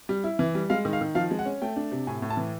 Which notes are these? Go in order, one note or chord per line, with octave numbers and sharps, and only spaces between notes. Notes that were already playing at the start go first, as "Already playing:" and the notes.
G3
E4
E3
G3
G#3 F5
D#3
F5
D#3
F3 F5
G#3
F#5
C#4
A3 G5
D4
C3
A2 G#5
A2
A5
E3